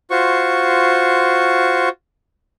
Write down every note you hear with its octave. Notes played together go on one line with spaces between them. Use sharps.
F4 F#4 C5 C#6